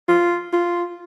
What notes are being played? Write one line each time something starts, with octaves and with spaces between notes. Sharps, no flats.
F4
F4